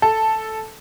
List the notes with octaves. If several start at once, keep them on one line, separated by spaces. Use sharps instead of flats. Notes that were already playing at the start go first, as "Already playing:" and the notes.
A4